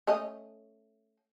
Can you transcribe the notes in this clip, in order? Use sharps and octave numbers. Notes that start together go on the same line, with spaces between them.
A3 C#4 D#5